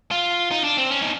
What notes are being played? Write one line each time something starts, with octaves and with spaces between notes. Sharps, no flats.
F4
D#4
D4
C4
C#4
D#4